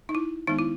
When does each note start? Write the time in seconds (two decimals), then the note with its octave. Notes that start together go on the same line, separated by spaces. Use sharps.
0.09 D#4
0.15 E4
0.47 D#3 G#3 B3 D#4
0.59 E4